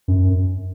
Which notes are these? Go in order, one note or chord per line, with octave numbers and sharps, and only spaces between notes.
F#2